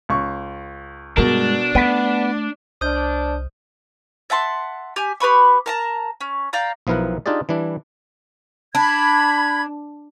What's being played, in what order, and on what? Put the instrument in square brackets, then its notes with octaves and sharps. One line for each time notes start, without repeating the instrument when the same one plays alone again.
[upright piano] C#2 C#6
[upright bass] G2 G#3 [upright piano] B2 A#4 [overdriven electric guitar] D4
[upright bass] A3 [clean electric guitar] B3 [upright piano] B6 D7 D#7
[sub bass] C2 [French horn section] D4 [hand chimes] C5 D#5 F6 [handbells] D#6 G6
[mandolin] E5 F#5 A5 C6
G4 G#5
G4 B4 B5 C#6
A#4 A5 A#5
C#4
D5 F5 G5 A#5
[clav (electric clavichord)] B1 F3 B3 E4 A#4 F#5
D4 D#4 F4 G4 G#4 D5
E3 G3 D4 E4
[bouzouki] D4 [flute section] B5 G#6